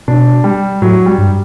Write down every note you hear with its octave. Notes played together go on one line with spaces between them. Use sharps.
B2 D4
G3
A2 F#3
G3
G2